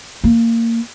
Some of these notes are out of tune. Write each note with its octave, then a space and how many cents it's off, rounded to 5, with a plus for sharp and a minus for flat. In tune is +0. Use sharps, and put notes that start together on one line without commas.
A#3 -20